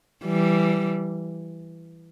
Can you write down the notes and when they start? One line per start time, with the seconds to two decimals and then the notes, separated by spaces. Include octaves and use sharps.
0.25 E3 G3